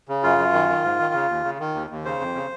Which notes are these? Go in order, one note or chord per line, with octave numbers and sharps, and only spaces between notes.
C#3
F#2 F4
F#2
D#3
D#3
G#2
D#3
C#3
D#2
C#3
D#3
D#2
D#2
C#3 C5
F2
C#3